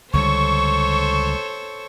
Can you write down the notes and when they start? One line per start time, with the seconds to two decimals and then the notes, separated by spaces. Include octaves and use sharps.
0.13 C#2 D3 G3 A4 C5 C#5 C#6